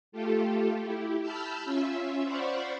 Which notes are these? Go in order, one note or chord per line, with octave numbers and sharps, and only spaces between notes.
A3 F4 G4 A4
E4 G4
A5 B5 E6 F6 G6
C#4 F4 E5
C5 D5 F5 F#5 B5 C#6